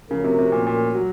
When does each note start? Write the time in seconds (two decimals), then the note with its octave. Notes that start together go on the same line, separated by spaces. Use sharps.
0.10 C#3 F3 A3 C#4 F#4 A#4
0.24 C3
0.39 C3
0.52 A#2
0.67 A#2
0.95 F#3